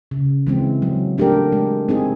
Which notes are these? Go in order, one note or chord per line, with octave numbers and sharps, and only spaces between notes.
C#3
E3 G#3 C4
F#3
A3 D4 G4 A#4
G#3
C4 D#4 G#4